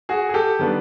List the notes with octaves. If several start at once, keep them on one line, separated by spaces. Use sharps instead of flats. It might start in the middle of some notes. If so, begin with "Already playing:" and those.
F#4 G#4
G#4
G4 A4
D#3 G3 B3 D4